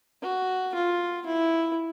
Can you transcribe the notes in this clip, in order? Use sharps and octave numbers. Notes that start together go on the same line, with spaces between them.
F#4
F4
E4